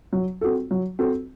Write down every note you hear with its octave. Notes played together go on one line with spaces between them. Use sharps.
F#3
C4 F#4 A4
F#3
C4 F#4 A4